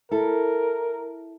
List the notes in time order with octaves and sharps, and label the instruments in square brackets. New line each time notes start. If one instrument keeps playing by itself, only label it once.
[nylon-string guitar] E4 A4 [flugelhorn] A#4